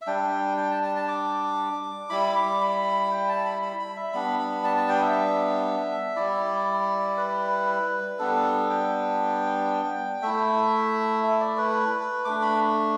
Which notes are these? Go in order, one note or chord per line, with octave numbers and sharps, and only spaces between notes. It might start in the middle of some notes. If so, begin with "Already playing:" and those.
E5
G3 D4 G5
G5
A5
A5
A5
D6
G3 E4 B5
D6
B5
G5
A5
B5
B5
B5
E5
G3 B3 D4 B5
B5
A5
A5
G5
E5
G3 E4 D5
B4
G3 B3 D4 A4
G5
A3 E4 E5
E5
D5
B4
A3 D4 D6
B5